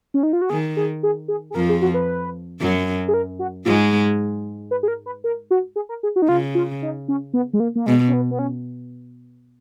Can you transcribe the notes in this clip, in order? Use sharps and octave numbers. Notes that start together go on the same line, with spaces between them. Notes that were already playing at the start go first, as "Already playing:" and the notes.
C#4
D#4
F4
F#4
D#3 G#4
G#4
G#4
G#4
G#4
F2 F3 A#4
G#4
F#4
B4
F#2 F#3
G#4
A#4
F#4
G#2 G#3 F4
B4
G#4
A#4
B4
A#4
F#4
G#4
A#4
G#4
F#4
D#4
C#3 F4
F4
D#4
C#4
B3
G#3
A#3
A#3
B2 G#3
C#4
B3
B3
C#4